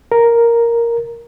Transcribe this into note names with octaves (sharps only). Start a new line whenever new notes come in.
A#4